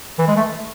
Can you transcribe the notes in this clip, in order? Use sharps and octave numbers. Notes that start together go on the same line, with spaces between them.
E3
G#3
A3